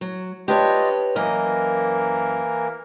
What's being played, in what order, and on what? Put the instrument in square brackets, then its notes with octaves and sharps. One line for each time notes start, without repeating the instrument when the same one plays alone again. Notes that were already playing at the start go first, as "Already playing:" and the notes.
[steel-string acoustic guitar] F#3
[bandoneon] D4 F4 D#5 [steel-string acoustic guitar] G4 B4 C#5
[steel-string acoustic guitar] F#2 D#5 [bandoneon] E3 A#3 A#4